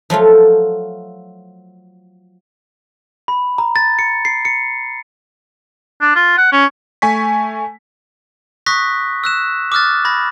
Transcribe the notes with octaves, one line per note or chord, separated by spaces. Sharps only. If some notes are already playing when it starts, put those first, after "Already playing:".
F3 F#3 A3 F4
B5
A#5
A6
C#7
C7
C#7
D4
F4
F#5
C#4
A3 G#5 C#6 B6
C#6 D#6 F#6 A#6 B6
E6 F#6 E7
D6 D#6 F6 F#6 A6
B5 G#6 A#6